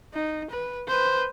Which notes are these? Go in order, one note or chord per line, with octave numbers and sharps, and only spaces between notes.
D#4
B4
B4 C5